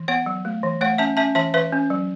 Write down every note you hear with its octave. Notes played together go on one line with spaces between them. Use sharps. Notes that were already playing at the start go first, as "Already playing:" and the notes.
Already playing: E3
B3 C#5 F#5
F#3
A3
E3
A3 C#5 F#5
C#4 E5 A5
C#4 E5 A5
E3 E5 A5
E3 B4 E5
C#4
F#3